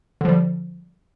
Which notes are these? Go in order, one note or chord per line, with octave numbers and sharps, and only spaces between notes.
D3 F3 G3